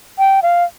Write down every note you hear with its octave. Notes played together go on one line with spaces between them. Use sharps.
G5
F5